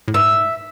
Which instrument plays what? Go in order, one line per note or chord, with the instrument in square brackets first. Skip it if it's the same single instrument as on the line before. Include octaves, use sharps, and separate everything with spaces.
[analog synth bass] A2
[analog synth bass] G#2 [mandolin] E5